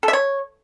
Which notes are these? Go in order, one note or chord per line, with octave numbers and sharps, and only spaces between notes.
A4
E5
C#5